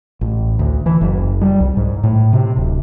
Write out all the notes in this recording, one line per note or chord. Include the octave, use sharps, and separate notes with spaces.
A1
D2
E3
F#1
G3
C2
G#2
A2
C3
D1